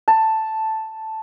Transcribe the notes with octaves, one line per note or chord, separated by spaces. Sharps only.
A5